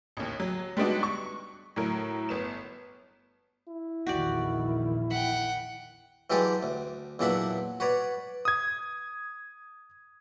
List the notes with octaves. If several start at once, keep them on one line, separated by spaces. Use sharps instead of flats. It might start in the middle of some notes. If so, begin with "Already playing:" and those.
A1 D#2
F#3
G3 G#3 B3 D4 D#4 F#4
C#6
A2 F#3 A#4
G1 B3 E7
E4
A#1 E2 D#3 F#4 G4 D5
F#5 G5 B5
E3 F#3 G#3 G4 A4 D5
D2
E2 A#2 F#3 D4 E5 F#5
F#4 B4 C#5 D5
D#6 G#6